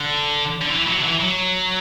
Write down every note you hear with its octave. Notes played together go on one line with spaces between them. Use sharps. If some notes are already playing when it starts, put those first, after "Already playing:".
Already playing: D3
D3
E3
F#3
D3
E3
F#3